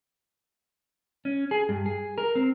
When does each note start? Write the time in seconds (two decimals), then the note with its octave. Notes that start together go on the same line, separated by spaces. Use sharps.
1.25 C#4
1.51 G#4
1.69 G2
1.86 G#4
2.18 A#4
2.35 C4